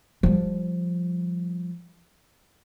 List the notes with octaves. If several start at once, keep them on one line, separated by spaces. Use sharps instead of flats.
F3 G3